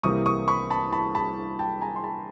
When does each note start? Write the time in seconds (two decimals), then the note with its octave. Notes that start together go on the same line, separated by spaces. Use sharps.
0.03 C2 C3 E3 G3 A#3 C#6 D#6
0.26 C#6 D#6
0.48 B5 C#6
0.70 A5 B5
0.92 A5 B5
1.15 A5 B5
1.59 G5 A5
1.81 G#5 A#5
1.96 C6
2.04 A5 B5